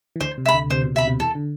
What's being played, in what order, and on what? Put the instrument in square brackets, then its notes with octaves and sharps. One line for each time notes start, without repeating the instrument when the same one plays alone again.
[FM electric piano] E3
[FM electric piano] D2 D3 [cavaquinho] C5
[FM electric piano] C3
[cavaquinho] E5 B5
[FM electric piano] D2 D3
[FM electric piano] C3 [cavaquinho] C5
[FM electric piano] B2
[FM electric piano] B2 [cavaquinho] E5 B5
[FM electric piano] C3
[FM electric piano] E2 E3 [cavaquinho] A4
[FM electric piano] D3